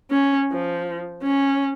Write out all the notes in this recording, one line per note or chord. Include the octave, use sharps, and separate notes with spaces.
C#4
F3
C#4